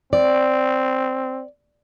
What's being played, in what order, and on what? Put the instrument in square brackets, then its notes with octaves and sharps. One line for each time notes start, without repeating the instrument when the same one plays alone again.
[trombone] C4 [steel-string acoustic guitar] D5